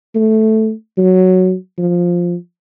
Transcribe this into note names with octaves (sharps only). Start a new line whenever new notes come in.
A3
F#3
F3